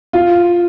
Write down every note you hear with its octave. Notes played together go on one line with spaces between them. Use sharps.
F4